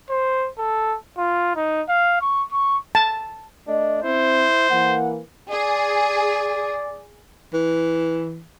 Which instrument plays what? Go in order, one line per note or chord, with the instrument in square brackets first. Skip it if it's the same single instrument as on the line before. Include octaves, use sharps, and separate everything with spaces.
[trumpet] C5
A4
F4
D#4
F5
C#6
C#6
[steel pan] A5
[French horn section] A3 D#5 [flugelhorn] D4
[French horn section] C4 [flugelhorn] E4 [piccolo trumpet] C5
[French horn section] E3 A#3 [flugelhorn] F#5
[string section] G#4 [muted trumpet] D5
[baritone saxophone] E3